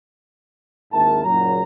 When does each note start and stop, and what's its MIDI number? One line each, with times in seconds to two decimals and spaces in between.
0.93 1.22 32
0.93 1.22 39
0.93 1.22 44
0.93 1.22 64
0.93 1.22 70
0.93 1.22 81
1.25 1.62 30
1.25 1.62 46
1.25 1.62 54
1.25 1.62 82